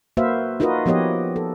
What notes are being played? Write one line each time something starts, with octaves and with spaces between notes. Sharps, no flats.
A#3 F#4 B4 C5 E5 F5
D#4 F4 F#4 A#4 B4 D#5
F3 B3 G4 C#5 D#5
A4